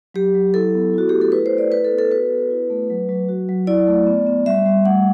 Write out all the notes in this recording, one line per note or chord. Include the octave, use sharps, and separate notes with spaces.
F#3 G4
F#3
E4 A4
B3
E4 F#4
A3 G4
A4
E4 B4
C5
A3
D5
E4 B4
A4
B3
A4
F#4 B4
B3
E4
A3
F#3
F#3
F#4
F#3
E4 D5
A3
B3
B3
G3 E5
G3
A3 F#5